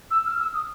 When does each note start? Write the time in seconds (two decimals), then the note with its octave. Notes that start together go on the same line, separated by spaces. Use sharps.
0.11 E6
0.26 F6
0.39 E6
0.54 D#6